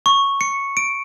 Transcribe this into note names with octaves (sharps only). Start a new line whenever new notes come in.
C#6
C#7
D7